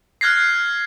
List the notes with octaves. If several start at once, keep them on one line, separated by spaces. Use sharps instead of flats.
F6 F#6 G#6 A#6 C7